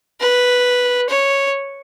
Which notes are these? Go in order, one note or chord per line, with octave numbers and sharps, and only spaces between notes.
B4
C#5